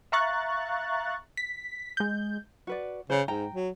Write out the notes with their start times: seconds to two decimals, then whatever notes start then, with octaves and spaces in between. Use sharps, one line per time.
0.12 E5 F5 A#5 C#6 F#6 A6
1.37 B6
1.97 G#3 G6
2.67 F#4 B4 D5
3.10 C#3 C5 C#5
3.28 G#2 G5 A#5
3.54 F#3